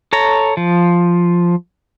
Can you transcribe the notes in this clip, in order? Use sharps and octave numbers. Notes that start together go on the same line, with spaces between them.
A4 C#5 A#5
F3